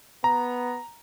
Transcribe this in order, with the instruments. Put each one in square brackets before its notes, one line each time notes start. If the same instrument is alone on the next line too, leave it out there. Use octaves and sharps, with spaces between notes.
[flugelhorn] B3 [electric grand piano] A#5